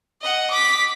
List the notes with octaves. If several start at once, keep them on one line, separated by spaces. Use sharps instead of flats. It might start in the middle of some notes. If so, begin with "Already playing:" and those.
D#5 F#5
D6 B6